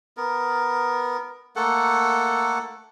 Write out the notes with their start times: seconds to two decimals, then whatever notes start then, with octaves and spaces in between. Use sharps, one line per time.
0.17 B3 A#4
1.56 A3 A#3 A4 F#5